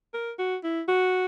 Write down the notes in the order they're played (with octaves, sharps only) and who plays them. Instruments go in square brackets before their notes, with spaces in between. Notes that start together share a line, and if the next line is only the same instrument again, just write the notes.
[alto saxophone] A#4
F#4
E4
F#4